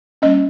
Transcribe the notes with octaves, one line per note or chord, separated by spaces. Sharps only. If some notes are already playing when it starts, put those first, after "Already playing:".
G3 A#3 C#4 D#5